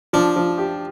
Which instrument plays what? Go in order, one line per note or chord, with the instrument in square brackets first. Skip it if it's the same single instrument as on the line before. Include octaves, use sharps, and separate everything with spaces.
[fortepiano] F3 [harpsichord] D4
[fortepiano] F3
G4